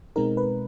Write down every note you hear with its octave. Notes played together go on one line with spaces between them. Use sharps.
B2 G#3 C4 D#4 A#4
B4